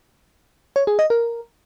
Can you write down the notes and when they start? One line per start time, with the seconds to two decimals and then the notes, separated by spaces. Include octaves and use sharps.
0.76 C#5
0.87 G#4
0.99 D#5
1.10 A#4